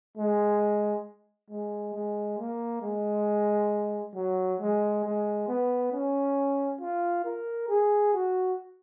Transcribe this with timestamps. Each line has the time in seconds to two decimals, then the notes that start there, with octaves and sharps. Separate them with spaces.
0.18 G#3
1.51 G#3
1.94 G#3
2.38 A#3
2.82 G#3
4.15 F#3
4.60 G#3
5.04 G#3
5.48 B3
5.93 C#4
6.80 F4
7.25 A#4
7.69 G#4
8.13 F#4